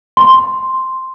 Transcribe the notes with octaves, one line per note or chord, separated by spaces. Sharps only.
C6